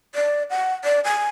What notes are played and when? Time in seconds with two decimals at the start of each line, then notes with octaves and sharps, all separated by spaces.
0.15 D5
0.50 F#5
0.84 D5
1.04 G#5